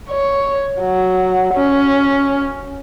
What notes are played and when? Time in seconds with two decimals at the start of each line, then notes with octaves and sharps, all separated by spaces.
0.10 C#5
0.81 F#3
1.54 C#4